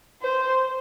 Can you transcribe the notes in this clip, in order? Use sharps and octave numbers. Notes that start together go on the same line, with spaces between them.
C5